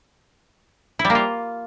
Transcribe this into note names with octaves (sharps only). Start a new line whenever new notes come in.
E4
G3
A#3
F4